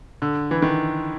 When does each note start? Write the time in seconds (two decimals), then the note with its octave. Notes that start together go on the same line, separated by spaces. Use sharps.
0.22 D3
0.51 E3
0.62 D#3